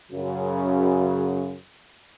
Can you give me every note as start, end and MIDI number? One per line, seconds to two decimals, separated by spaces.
0.12 1.56 42
0.12 1.56 49